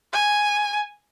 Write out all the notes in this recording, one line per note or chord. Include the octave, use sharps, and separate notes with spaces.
G#5